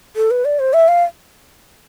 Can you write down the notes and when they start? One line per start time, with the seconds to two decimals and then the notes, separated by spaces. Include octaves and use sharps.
0.16 A4
0.31 B4
0.45 D5
0.59 C5
0.73 E5
0.88 F5